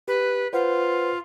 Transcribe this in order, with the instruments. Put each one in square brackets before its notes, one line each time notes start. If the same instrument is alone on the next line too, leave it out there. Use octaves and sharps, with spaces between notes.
[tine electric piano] G4 [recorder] B4
[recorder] F4 [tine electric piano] B4 C5 F#5